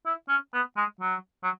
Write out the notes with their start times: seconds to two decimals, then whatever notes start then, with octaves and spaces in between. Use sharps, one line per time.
0.06 E4
0.29 C#4
0.54 B3
0.77 G#3
1.01 F#3
1.43 F#3